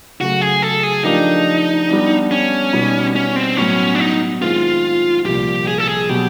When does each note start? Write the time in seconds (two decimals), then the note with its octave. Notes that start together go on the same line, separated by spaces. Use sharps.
0.20 C#3 F#3 A3 F#4
0.41 G#4
0.62 A4
0.83 G#4
1.04 F3 A3 D4 D#4 G4 A#4
1.89 G3 B3 D4
2.31 C#4
2.73 B2 G3 B3 D#4
3.16 C#4
3.36 C4
3.57 A2 F#3 B3 C#4
3.95 D4
3.99 D#4
4.41 D#3 G#3 C4 E4 F4
5.25 C2 A#2 F3 G4
5.68 G#4
5.78 A4
5.88 G#4
6.09 B2 F#3 B3 G4